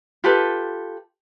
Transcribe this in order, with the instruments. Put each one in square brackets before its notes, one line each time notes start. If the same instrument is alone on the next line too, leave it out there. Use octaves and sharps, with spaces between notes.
[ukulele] F4 G4 A4 B4